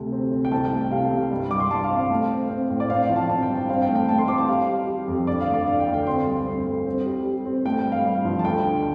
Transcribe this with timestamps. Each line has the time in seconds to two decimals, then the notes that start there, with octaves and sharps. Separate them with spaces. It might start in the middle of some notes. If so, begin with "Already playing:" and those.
Already playing: D2 C3 A3
0.12 C4
0.32 C4
0.45 G5
0.51 C2 A5
0.65 G5
0.71 A3
0.91 C3 F5
1.11 C2
1.31 G2
1.51 G2 D6
1.60 C6
1.71 G2 A5
1.84 F5
1.91 C4
1.97 F5
2.10 A3
2.30 C4
2.50 C4
2.70 A2
2.80 D5
2.89 C4 F5
3.03 F5
3.09 F3
3.16 A5
3.29 C4 A5
3.43 G5
3.49 G2
3.55 A5
3.69 C4 F5
3.82 G5
3.89 A3
3.95 G5
4.09 A3 A5
4.18 C6
4.28 C4 D6
4.38 A5
4.48 G3 F5
4.68 G3
4.88 G3
5.08 F2
5.27 D3 D5
5.41 F5
5.47 D2
5.54 D5
5.67 D3 F5
5.80 G5
5.87 D2
5.94 G5
6.07 C4 C6
6.27 G2
6.47 C4
6.67 G2
6.86 C4
7.06 G3
7.26 G3
7.45 C4
7.65 A3 G5
7.79 G5
7.86 G2
7.92 F5
8.05 G2
8.25 F3
8.39 A5
8.45 D2 G5
8.65 D3